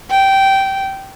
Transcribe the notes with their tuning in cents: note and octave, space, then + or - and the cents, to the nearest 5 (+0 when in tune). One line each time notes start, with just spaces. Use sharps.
G5 -15